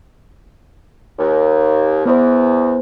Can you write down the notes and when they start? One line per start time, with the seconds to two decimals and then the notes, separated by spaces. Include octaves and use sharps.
1.19 D#2
2.05 E2 B3 C5